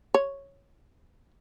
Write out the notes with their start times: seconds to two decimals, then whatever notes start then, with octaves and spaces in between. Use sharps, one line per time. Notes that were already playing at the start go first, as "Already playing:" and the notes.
0.14 C#5